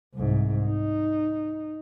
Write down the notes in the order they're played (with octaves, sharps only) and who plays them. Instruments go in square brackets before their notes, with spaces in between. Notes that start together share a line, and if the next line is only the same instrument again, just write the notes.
[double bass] C2 G#2
D#4